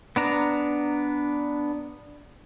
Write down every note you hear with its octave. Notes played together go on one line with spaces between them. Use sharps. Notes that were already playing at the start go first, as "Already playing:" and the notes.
B3 D4 A#5